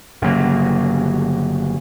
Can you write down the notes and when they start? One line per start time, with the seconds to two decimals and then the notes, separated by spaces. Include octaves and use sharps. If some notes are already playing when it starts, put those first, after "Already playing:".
0.22 G1 C#3 F#3 A#3